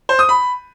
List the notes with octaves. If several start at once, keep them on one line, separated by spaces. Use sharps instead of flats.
C5
D#6
B5